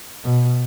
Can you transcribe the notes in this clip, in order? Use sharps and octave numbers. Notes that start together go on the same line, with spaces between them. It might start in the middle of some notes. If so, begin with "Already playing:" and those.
B2